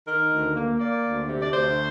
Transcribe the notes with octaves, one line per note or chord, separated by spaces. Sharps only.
D#3 A#4
D2
A#3
A#3 D5
D2
C3
D5
D2 C5